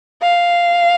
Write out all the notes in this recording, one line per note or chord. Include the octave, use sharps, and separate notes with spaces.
F5